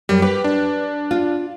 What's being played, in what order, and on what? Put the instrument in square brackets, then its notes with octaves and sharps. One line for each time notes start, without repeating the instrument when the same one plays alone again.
[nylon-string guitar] F#2 [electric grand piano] G3
[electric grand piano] G4 [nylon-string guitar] B4
[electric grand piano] D4
[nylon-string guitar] F4